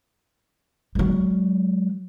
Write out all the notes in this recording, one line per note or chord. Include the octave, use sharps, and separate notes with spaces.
F#3 G#3